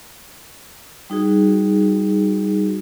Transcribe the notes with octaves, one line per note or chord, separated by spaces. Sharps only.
G3 D#4 F#4 G#4